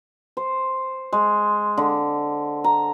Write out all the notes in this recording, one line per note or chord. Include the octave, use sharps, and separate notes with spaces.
C5
G#3
D3
A#5